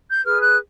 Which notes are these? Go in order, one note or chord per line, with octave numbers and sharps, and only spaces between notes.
G6
G#4 B4 F6
F#6